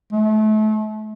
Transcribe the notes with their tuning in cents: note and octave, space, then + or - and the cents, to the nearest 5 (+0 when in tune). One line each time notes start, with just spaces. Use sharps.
A3 -30